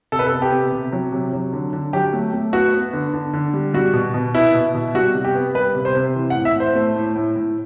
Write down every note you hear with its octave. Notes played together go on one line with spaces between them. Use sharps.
C3 A4
B4
A4
B3
G4
C3
C3
F#3
C3
F#3
D3
D3
F#3 G4
A3
A3
B3 F#4
B3
D3
D3
D3
G3
G3 F#4
B2
B2
B3 E4
B2
B2
G3 F#4
C3
G4
B3
G3 B4
C3
C5
C3
E3
F#5
A2
E5
A2
C5
A3
A2
A2
A2